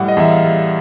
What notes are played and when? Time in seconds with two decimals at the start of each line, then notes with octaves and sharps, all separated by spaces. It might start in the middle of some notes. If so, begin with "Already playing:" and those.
Already playing: A2 G3 F#5
0.08 D#5
0.17 E2 E5
0.31 F5
0.44 G3